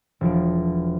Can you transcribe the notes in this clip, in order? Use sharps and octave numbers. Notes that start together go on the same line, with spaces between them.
E1 F3 D7